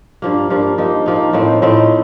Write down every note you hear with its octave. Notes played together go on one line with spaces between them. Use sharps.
G2 F3 A#3
G2 F3 A#3
F3 A#3 D#4
F3 A#3 D#4
A2 F3 C4 D#4
A2 F3 C4 D#4